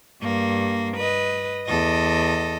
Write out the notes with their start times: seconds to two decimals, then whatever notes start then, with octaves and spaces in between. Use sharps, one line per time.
0.22 G2 A#3
0.97 B4 D#5
1.67 E2 A4 D#5